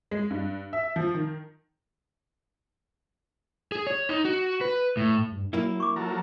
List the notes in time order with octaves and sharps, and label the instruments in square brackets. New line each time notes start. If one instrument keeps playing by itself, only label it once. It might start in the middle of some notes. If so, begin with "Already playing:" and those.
[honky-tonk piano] G#3
G2
E5
F3
D#3
[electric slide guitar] G#4
C#5
D#4
F#4
B4
A2
[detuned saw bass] G2
[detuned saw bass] F#3 [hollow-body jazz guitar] A#3 E4
[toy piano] C#6 D6
[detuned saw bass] F3 [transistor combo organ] F#3 A4 A#4